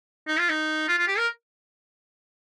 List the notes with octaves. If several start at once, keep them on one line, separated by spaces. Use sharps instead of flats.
D#4
F4
D#4
F4
F4
G4
A#4